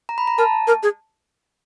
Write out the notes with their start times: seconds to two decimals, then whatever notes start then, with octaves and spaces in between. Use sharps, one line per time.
0.09 A#5
0.18 B5
0.27 A#5
0.38 A#4 A5
0.67 A#4
0.83 G#4